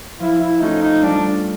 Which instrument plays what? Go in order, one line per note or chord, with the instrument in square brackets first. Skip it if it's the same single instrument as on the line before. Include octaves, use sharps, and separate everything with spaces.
[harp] F3 [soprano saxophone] E4
[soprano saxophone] E4
[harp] A3 C#4 F4 A4 [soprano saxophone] D#4
[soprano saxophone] D#4
[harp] G3 [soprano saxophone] D4